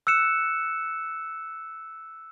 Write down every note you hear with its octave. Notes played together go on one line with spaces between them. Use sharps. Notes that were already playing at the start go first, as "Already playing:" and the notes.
E6 F#6 C#7 E7